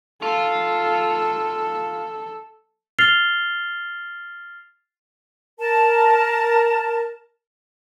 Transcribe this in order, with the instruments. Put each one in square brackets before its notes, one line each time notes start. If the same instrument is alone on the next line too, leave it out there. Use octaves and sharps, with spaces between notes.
[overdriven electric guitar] F4 [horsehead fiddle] A4
[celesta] F6 A6 C7 F7 G7
[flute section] A#4 A5